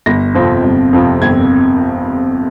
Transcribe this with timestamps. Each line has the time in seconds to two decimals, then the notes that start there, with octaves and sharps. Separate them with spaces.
0.06 G1 A#6
0.34 F2 C3 F3 C4
0.64 G1
0.93 F2 C3 F3 C4
1.22 G1 G#6